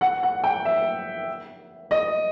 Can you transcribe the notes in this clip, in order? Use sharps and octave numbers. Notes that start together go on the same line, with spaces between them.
F#5
F#5
G5
E5
D#5